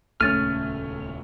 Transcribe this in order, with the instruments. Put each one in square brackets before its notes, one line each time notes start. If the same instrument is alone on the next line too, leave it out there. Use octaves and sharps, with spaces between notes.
[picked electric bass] D#1 C#2 G#3 [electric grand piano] A3 C#4 [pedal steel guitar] F6 [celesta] A6 D#7